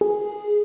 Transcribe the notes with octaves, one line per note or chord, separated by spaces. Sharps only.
G#4